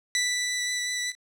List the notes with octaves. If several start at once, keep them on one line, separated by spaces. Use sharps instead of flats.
B6